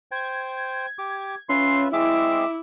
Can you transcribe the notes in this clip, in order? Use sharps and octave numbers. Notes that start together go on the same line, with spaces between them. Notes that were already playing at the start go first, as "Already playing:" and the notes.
C5 G5 G#6
G4 D6
C#4 F4 B4 E5 C6
G#3 C4 E4 G#4 E5 D6